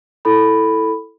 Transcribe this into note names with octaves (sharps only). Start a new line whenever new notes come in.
E4 A4 B5